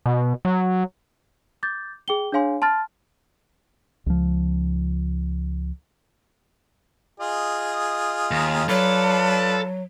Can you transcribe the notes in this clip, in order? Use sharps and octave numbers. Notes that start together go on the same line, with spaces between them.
B2
F#3
D6 G6 A6
G#4 G5 G7
D4 G#4 C#5 F5 G#5 C6
A5 C6 F6 A6
C#2 F3
F4 G#4 D#5
D#2
F#3 F4 A4 B4 D5